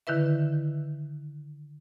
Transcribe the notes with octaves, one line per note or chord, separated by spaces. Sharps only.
D3 D#3 E4 B4 E5